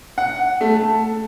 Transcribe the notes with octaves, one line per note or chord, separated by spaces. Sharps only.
F#5
A3
A5